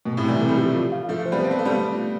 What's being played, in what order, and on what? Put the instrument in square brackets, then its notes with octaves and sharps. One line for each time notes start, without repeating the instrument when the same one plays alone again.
[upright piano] B2 [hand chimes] A3
[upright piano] A2 C3
[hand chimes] E4
[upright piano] E3 G3
[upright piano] A3 [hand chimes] C4
[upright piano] G3
[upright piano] F3 A3 [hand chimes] G4
[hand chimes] F4
F5
[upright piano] F3 A3 [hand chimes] E5
[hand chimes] C5
[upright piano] G3 B3
[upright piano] C4 [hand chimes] A5
[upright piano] B3
[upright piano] A3 [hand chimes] F5
[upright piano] G3 B3
[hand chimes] A3
F4